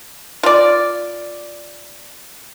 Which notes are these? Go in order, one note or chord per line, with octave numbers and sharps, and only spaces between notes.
F4 D5